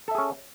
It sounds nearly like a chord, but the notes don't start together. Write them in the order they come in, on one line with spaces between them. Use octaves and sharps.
A4 E5 G#4 C#4